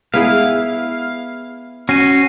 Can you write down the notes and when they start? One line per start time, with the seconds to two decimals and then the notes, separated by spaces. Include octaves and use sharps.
0.14 B3 E4 G#4 F5
1.89 C#4 F#4 C7 D#7